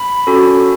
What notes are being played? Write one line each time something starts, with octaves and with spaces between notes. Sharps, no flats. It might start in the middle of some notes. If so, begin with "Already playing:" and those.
Already playing: B5
C#4 F#4 A4